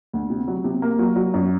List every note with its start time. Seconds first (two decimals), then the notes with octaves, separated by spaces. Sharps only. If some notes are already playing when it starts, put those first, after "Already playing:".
0.13 D2
0.30 C3
0.48 F#3
0.64 C3
0.82 A#3
0.99 F#3
1.16 F#3
1.34 F#2